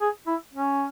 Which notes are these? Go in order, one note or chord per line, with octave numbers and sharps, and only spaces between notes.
G#4
E4
C#4